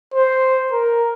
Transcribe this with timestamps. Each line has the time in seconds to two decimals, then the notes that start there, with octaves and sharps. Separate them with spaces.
0.14 C5
0.72 A#4